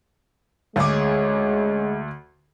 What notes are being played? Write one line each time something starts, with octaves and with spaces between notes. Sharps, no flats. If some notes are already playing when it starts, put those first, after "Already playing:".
D2 G#3 C#4 G#4 D6